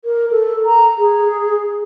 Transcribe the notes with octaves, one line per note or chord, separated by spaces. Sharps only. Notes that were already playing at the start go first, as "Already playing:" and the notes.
A#4
A4
A#5
G#4